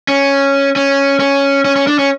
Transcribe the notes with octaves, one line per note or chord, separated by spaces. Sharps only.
C#4
C#4
C#4
C#4
C#4
D4
C#4